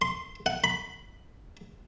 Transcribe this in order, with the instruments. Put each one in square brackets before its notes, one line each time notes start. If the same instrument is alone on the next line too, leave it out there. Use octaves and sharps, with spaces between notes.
[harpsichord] C6
F#5
B5